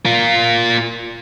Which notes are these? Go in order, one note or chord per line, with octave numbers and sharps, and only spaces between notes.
F4 A#4